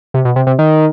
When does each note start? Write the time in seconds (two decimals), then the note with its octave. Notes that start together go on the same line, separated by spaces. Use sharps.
0.14 C3
0.25 B2
0.36 C3
0.47 C3
0.59 D#3